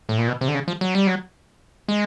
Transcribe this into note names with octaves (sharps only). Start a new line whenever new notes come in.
A2
A#2
B2
C3
D3
C#3
F3
F#3
G3
F#3
G#3